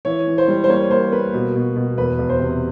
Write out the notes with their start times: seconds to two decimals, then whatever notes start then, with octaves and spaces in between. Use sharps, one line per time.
0.05 E3 C#5
0.27 E3
0.38 C5
0.48 G3
0.64 C5
0.69 A#3 C#5
0.90 A#3 C5
1.12 A#3 B4
1.33 B2
1.55 B2
1.76 B2
1.98 E2 B4
2.19 E2
2.29 C5
2.40 C3